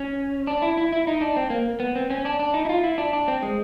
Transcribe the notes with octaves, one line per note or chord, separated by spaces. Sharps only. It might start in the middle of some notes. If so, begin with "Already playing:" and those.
Already playing: C#4
D4
E4
E4
E4
D#4
D4
C4
A#3
B3
C4
C#4
D4
D4
D#4
E4
F4
E4
D4
D4
C4
G#3